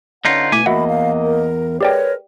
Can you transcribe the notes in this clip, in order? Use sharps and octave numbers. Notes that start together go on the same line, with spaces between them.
D3 C#4 D#4 F4 B4 F#5
B2 A3 E4 G#5 D6 B6
E2 A#3 F#4 D#5 E5 F#5 B5
F5
A#4
G#3 G4 A#4 B4 C#5 D5 G5